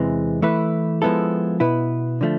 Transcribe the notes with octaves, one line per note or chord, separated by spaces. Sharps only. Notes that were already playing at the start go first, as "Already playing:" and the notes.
Already playing: E2 C3 E3 G#3
E3 A3 E4 B4
F3 G#3 B3 E4 A4
B2 B3 E4 B4
D3 F3 A3